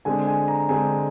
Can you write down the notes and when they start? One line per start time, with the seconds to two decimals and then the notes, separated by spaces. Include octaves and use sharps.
0.05 D3 G#3 C4 G#5
0.27 G#5
0.48 A#5
0.69 D3 G#3 C4 G#5